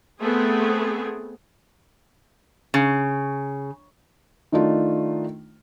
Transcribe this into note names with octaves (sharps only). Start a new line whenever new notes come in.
A3 B3 C4 G#4
C#3
D#3 A3 D4 D#4 F4